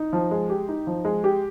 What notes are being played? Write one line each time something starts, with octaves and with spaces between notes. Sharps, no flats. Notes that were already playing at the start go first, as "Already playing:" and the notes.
Already playing: D#4
F3
G#3
G4
D#4
F3
G#3
G4